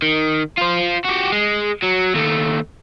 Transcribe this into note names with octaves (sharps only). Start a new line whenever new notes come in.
D#3
F4 C5
F#4 G4
G#3
F#3
D#2 A3